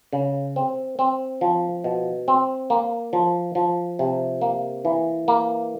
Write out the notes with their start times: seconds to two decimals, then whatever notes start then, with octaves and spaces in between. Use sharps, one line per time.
0.13 C#3
0.56 C4
0.99 C4
1.41 F3
1.84 B2
2.28 C4
2.70 A#3
3.13 F3
3.55 F3
3.99 C3
4.41 A#3
4.85 E3
5.28 A#3